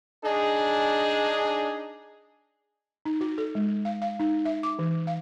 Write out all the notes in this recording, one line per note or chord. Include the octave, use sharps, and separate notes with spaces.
D4 D#4 G#4
D#4
F#4
A4
G#3
F5
F5
D#4
E5
D6
E3
F5